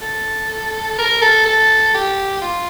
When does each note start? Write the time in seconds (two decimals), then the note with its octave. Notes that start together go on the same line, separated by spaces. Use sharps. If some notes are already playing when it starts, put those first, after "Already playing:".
0.01 A4
0.98 A#4
1.22 A4
1.45 A4
1.94 G4
2.41 F4